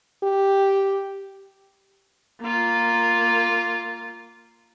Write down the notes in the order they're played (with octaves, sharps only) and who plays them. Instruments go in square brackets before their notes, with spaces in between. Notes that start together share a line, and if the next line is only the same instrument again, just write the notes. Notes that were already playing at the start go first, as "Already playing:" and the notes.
[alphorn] G4
[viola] A#3 F4